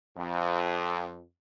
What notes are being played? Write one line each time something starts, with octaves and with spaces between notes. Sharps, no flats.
F2